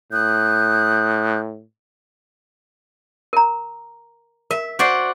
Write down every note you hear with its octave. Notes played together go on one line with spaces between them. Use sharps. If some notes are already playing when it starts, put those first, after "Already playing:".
A2 D#6 F#6 G6
A#4 A#5
A#4 E5
F#4 C5 D5